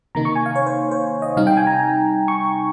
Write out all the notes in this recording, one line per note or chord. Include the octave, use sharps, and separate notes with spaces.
C3 D#3 A#3 D#4 A#5
C#6
G#5
F5
C#5
C5
C5
D#5
C3 G3 C4 D#4 F5
G5
G#5
A#5
C#6